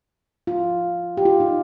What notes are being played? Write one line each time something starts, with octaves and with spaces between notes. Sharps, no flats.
F4
G4
F4
D#4